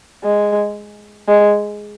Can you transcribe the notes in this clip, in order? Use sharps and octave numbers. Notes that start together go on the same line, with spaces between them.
G#3
G#3